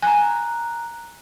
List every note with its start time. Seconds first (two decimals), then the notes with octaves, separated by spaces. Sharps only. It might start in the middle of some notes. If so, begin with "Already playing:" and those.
0.02 G#5 A#5 F#6